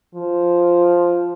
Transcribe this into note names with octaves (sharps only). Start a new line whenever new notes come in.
F3